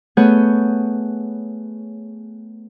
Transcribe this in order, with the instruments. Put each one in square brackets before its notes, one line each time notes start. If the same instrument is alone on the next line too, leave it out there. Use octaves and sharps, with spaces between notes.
[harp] A3 B3 G#4 C#5 F#5 G6